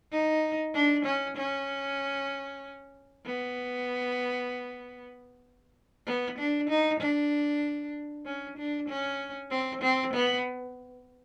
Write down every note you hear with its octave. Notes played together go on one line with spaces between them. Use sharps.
D#4
D4
C#4
C#4
B3
B3
D4
D#4
D4
C#4
D4
C#4
C4
C4
B3